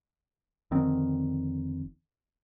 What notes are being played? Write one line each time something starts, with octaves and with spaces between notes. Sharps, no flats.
F1 D3 D#3 C4